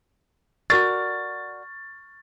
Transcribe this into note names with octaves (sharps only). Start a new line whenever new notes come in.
F#4 A#4 D5 C#6 F6 A6